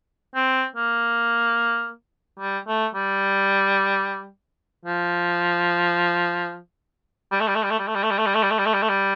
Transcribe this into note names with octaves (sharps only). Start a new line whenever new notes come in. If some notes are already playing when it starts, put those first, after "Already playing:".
C4
A#3
G3
A3
G3
F3
G3
A3
G3
A3
G3
A3
G3
A3
G3
A3
G3
A3
G3
A3
G3
A3
G3
A3
G3
A3
G3